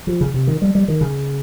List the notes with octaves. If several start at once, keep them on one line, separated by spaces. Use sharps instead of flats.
F3
C#3
C3
D#3
G3
G3
D#3
C#3